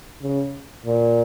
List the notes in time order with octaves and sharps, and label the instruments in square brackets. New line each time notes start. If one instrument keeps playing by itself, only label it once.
[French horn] C#3
A#2